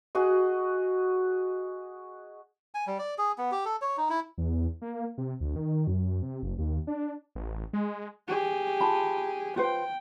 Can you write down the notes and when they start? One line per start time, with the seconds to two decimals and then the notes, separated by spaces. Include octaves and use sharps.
0.15 F#4 G#4 D#5
2.75 G#5
2.87 G3
2.99 D5
3.18 G#4
3.38 B3
3.51 G4
3.65 A4
3.82 C#5
3.97 D#4
4.10 E4
4.38 E2
4.81 A#3
5.18 C3
5.40 D2
5.56 D#3
5.87 F#2
6.22 C3
6.43 F#1
6.58 D#2
6.87 D4
7.35 A1
7.73 G#3
8.28 G4 G#4
8.81 F4 A5 B5
9.56 F4 B4 C5 G5